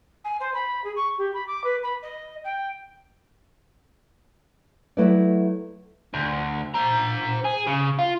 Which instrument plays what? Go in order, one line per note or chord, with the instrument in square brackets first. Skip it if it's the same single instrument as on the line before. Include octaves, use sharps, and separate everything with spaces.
[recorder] G#5
C5
B5
G#4
C#6
G4
B5
D6
B4
B5
D#5
G5
[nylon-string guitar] F#3 A3 E4 A4 B4 D5
[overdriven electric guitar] D2
C5 A#5
G#4
C#3
F4